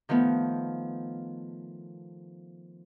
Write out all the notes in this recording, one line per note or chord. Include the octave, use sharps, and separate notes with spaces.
D#3 F3 A3 B3